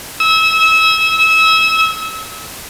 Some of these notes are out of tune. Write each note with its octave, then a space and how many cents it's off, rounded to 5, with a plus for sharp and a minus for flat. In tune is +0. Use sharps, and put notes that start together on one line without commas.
E6 -30